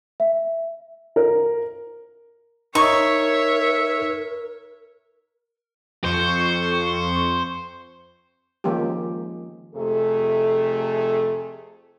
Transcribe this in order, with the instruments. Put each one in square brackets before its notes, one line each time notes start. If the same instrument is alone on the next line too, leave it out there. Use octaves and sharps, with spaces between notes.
[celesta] E5
[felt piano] A#4
[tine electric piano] D#4 [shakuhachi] A#4 [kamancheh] C#5 E5 [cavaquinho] C#6
[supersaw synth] F2 C#6 [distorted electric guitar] C5
[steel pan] D#3 F3 G#3 A#3 C#4 G4
[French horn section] F2 C3 A3 G#4 A4